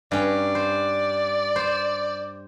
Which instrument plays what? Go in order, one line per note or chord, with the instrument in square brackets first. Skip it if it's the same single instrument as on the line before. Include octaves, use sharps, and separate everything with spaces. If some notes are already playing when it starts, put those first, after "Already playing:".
[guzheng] G2 C#4 [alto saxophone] D5
[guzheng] C5
C5